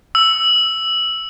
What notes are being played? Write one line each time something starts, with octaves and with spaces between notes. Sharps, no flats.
E6